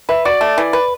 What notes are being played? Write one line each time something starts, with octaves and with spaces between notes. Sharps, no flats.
B4 E5
F#4 D5
A3
E3
B4